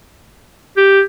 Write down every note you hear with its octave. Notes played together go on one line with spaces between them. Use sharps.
G4